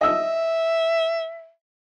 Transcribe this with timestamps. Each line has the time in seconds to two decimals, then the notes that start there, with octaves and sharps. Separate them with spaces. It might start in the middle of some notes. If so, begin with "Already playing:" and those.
0.01 D#5 E5 E6